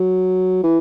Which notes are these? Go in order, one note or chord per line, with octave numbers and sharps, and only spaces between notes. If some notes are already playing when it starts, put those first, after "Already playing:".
Already playing: F#3
E3